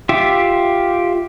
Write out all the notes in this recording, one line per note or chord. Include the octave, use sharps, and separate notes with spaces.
F4 G4 E5